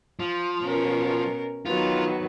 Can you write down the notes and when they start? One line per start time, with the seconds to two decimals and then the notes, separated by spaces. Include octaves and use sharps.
0.20 F3
0.62 B2 C#4 A#4
1.66 D#3 F#3 B3 F4